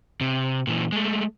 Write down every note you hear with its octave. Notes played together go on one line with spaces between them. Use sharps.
C3
A#2 E3
G#3 A3